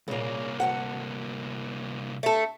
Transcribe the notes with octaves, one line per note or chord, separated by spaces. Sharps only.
C2 A#2 C#3 A#3
D2 F3 F#5
A3 A4